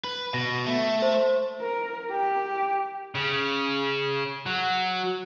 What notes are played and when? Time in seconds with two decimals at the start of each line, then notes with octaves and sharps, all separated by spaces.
0.04 B4
0.34 B2 A#6
0.66 A3
1.02 C5
1.61 A#4
2.11 G4
3.15 C#3
4.46 F#3